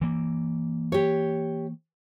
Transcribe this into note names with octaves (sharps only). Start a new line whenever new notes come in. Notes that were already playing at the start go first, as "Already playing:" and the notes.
E3 A#3
G4 C#5